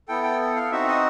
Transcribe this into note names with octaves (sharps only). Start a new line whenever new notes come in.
B3 E4 A4 G5
G5
F5
C4 D#4 F#4 E5
D#5